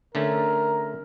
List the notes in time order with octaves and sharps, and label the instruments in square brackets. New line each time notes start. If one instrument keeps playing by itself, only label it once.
[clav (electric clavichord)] D3 A3 C#4 [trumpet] A#4